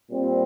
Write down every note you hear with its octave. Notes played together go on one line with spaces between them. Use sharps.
A#2 G3 C4